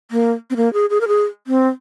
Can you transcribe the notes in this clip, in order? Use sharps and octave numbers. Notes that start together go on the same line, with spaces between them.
A#3
C4
A#3
G#4
G#4
A#4
G#4
C4